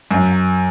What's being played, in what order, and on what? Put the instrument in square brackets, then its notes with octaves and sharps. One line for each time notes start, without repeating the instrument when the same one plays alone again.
[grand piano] F#2